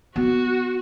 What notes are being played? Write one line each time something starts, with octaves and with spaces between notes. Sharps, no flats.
B3 F#4